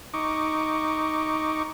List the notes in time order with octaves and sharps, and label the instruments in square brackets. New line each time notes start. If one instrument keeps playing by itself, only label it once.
[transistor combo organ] D#4 C#6 D6